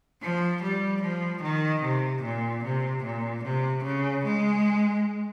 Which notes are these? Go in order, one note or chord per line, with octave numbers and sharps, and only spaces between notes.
F3
G3
F3
D#3
C3
A#2
C3
A#2
C3
C#3
G#3